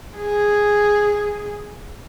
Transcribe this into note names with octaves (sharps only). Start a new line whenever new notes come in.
G#4